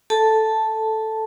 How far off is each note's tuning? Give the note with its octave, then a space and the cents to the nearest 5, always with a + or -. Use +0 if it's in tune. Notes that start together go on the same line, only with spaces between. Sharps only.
A4 +0 A5 +0